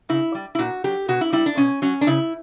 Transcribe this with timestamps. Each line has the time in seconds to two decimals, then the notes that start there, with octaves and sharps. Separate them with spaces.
0.09 C#3 E4
0.35 G3
0.55 E4
0.58 A#2 F#4
0.84 F#3 G4
1.08 B2 F#4
1.21 E4
1.32 G3 E4
1.46 D4
1.57 B2 C#4
1.82 F#3 C#4
2.01 D4
2.07 C#3 E4